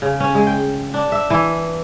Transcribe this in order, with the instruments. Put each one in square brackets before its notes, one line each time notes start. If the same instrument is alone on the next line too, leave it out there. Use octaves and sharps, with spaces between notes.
[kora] C#3
C#4
G#3
G5
D4
E5
E3